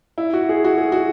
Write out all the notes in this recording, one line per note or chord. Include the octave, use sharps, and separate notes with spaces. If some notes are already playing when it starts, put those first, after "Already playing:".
E4
F#4
G#4
F#4
G#4
F#4